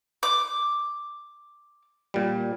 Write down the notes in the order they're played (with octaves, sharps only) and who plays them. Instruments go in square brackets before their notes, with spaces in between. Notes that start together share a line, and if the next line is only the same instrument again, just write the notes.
[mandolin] D6
[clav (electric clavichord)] A#2 G3